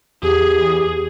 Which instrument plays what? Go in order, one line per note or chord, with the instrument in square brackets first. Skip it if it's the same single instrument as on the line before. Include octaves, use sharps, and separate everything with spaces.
[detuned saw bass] E2 [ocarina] G4 [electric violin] G#4